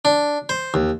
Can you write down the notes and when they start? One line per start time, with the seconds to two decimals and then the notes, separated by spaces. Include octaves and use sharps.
0.05 D4
0.49 C5
0.74 D#2